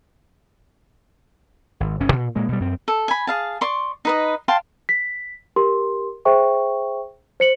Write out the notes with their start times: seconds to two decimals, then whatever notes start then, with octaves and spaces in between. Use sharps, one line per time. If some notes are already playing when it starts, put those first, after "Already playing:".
1.80 G#1
2.00 F#1 G2 C3 C#4
2.12 A#2
2.35 A#2 G#3 A#3
2.48 B2 G3
2.60 F#2 C4
2.88 A4
3.08 G#5 B5
3.27 G#4 F5 A5
3.61 D5 C6 C#6
4.05 D#4 B4 D#5
4.48 F5 G5 A5 C6
4.89 B6
5.56 G4 A#4 C6
6.25 G#4 C5 E5 G5 C#6
7.40 C5 C#7 F#7